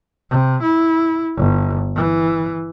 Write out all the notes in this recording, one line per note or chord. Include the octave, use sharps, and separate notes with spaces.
C3
E4
G1
E3